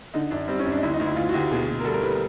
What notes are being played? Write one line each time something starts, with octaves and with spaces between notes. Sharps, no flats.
D3 D#4
F#2 D4
G3 C4
C#4
F#2
D4
D#4
D2 E4
D#4
D2
E4
D2 F4
F#4
D2 G4
B2 G#4
B2
A#4
G3 A4
A#4
G3 B4
A#4